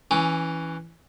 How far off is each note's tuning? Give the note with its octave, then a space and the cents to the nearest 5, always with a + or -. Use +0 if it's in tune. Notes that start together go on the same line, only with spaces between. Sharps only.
E3 +0 C#4 +10 D6 +20